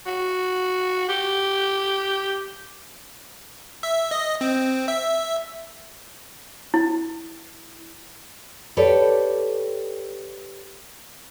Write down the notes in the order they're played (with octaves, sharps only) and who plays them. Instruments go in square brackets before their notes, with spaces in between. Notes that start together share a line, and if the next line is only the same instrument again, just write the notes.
[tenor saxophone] F#4
G4
[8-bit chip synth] E5
D#5
C4
E5
[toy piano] E4
[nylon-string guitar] G4 A4 B4 C#5 D5